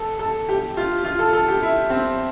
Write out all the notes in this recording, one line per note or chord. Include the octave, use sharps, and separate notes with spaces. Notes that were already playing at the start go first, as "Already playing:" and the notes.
Already playing: A4
A4
G4
F4
F4
A4
A4
G4
E4
C4